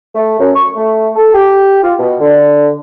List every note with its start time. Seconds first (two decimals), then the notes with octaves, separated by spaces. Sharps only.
0.15 A3
0.40 F#2
0.55 C#6
0.76 A3
1.16 A4
1.34 G4
1.83 F4
1.99 B2
2.21 D3